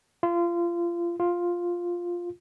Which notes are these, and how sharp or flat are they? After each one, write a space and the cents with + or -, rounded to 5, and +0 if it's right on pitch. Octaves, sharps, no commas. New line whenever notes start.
F4 -25
F4 +5